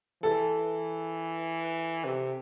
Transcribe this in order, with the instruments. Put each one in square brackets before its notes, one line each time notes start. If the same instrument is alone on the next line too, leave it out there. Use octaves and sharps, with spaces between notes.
[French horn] E3 [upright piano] A4
[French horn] C3